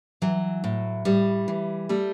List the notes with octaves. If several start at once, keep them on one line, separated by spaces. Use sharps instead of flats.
E3 F#3
A2
A2 G3
E3
G3 A3